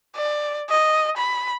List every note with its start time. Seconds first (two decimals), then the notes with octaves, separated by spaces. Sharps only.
0.16 D5
0.69 D#5
1.17 B5